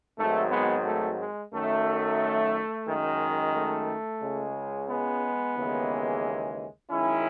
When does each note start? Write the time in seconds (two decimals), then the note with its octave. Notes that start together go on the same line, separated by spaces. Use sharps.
0.18 G#1 G#2 D#3 F#3 A3
0.51 G#3 B3
0.86 A3
1.19 G#3
1.52 F#2 D#3 F#3 A3
2.87 F#2 D#3 G#3
3.54 A3
4.21 C#2 C#3 G#3
4.89 G#3 B3
5.56 D#2 C#3 E3 G#3
6.90 F#2 D#3 G#3 C#4 E4